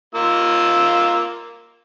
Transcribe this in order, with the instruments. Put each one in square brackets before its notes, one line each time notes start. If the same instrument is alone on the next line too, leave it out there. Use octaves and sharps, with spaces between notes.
[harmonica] A#3 F4 E6